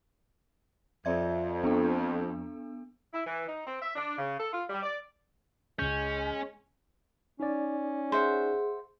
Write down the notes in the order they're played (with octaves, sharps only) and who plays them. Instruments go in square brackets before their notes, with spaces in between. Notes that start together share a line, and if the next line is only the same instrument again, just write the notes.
[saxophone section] F2 [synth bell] D5 E5 G#6
[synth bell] B3 D4 A4
[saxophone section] E4
E3
D#4
C4
E5
D4
C#3
A4
F4
G3
D5
[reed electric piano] C#2 G6 [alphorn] G#3 [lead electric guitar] C#4
[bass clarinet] C#4 [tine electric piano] D#4 D5
[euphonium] G#4 [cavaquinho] C5 E5 F#5